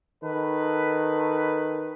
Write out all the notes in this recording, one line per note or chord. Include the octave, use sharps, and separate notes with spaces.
D#3 A4 B4